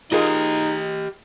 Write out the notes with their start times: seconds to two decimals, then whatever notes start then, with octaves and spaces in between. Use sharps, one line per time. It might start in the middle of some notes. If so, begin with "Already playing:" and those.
0.12 D#4 F4 G4 G#4 A#4 D#5